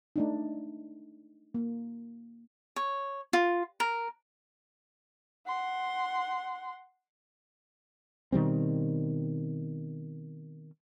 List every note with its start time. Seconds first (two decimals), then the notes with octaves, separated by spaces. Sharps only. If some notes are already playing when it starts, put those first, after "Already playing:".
0.16 A3 D4 D#4
1.54 A#3
2.76 C#5
3.33 F4
3.80 A#4
5.47 F#5 C6
8.32 B2 D#3 G3 C4